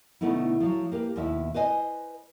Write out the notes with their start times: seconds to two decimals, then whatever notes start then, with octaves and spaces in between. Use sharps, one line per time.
0.21 B2 D3 A3 B3 D#4 E4
0.60 F3 F#3
0.92 A#3 G4 B4
1.16 D#2 B2 E4 E5
1.54 B4 C5 D#5 G#5